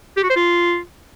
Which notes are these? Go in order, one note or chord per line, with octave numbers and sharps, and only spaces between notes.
G4
F#4
C5
F4